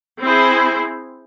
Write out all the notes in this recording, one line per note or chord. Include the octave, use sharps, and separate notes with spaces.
C4 E4 G#4 C5